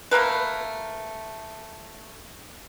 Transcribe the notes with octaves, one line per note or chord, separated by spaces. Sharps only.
A3 A#3 A#4 B4